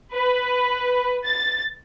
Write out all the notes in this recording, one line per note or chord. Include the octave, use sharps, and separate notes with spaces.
B4
A6